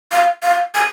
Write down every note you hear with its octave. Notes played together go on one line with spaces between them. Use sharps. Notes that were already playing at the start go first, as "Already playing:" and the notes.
F5
F5
G#5